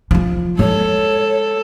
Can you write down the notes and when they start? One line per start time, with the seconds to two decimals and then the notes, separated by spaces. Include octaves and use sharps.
0.11 F3 F4
0.59 G#3 A4 C#5